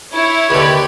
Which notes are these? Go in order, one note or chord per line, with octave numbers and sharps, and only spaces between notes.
E4 C#5
D#2 D3 G4 B4